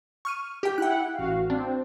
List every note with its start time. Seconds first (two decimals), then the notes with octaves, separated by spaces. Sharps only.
0.25 C#6 F6 D#7
0.63 G4 G5
0.78 E4 F#5 G5 F#6
1.15 A1 F#4 F5
1.50 C4 D4